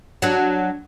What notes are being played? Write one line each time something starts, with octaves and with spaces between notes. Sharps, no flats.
F#3 D4